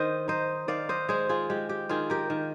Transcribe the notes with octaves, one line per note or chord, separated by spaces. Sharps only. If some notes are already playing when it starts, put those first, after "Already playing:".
Already playing: D#3 C5 D#5
D#4 C5 D#5
D#3 D5 F5
C5 D#5
G#3 G#4 C5
F4 G#4
G#3 G4
G4
D#3 F4 G#4
G4 A#4
D#3